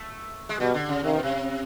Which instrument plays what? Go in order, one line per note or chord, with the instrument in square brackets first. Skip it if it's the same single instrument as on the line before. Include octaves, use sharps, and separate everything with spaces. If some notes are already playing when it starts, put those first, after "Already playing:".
Already playing: [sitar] A3
G#3
[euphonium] B2 [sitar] G3
[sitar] D3
C#3
[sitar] C3 [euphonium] D#3
[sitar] B2
C3